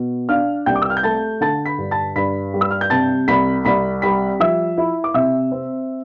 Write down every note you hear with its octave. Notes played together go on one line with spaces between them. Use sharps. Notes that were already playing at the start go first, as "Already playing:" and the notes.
Already playing: B2
D4 F5 F6
C2 G5 G6
D6
E6
F6
G6
A3 A5 A6
D3 A5 A6
B5 B6
G2
A5 A6
G2 B5 B6
G3
E6
F6
G6
C3 A5 A6
C2 B5 B6
C2 B5 B6
G3 B5 B6
F3 E5 E6
E4
D6
C3 E5 E6
C4